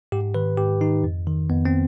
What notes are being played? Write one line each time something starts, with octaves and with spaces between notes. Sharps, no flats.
G#2 G4
D#3 B4
G#2 G4
D#3 D#4
F2
D#3
F2 B3
C4